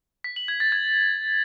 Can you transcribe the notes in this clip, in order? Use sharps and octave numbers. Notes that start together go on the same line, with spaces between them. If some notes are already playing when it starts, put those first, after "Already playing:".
B6
F#7
G#6
A6
G#6